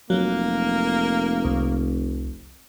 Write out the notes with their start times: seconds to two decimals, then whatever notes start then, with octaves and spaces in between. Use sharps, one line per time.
0.10 F1 F#3 A#3
1.44 C2